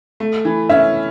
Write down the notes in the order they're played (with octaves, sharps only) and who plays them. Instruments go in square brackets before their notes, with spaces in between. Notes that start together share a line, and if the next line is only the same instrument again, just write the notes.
[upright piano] A3
E3
[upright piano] C#4 [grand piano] E5